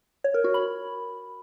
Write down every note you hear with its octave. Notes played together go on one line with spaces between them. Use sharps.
C#5
A#4
F#4
B5